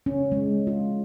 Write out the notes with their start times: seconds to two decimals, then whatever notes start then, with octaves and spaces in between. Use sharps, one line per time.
0.06 C#4
0.32 G#3
0.67 F4